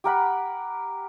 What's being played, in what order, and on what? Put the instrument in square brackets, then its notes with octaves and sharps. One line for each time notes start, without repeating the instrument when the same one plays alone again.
[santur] G4 A#4 F#5 B5